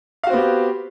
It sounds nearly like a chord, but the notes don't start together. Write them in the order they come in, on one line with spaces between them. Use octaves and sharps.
F5 F#4 C4 B3 G4